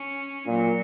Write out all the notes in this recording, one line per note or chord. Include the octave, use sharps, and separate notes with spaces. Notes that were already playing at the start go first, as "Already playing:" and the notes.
Already playing: C#4
A#2 F#3